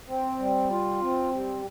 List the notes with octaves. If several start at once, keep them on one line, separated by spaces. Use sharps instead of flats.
C4
G3
F4
C4
G3